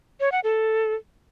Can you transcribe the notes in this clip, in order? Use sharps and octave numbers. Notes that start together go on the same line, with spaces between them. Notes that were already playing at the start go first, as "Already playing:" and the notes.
C#5
F#5
A4